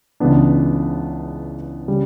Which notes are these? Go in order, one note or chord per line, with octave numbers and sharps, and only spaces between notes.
C#2 C#3 E3 B3 D4
C#3 G3